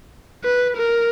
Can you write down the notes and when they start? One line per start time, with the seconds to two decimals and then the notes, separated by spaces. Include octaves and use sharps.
0.44 B4
0.77 A#4